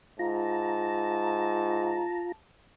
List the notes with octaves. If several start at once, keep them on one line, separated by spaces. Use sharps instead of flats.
G#2 F4 A5 A#5